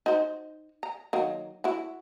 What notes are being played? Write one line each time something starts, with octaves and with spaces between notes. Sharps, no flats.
D#4 F#4 C5
A#5
D#3 F#3 A#3
E4 F#4